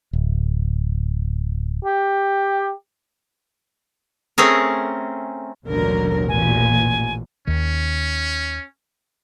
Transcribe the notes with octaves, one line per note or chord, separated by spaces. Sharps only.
D1
G4
A3 C4 C#4 G#4 A#4
A1 D#2 B2 D3 F#3 A#4
A#2 E3 G#5
D#2 D#3 C#4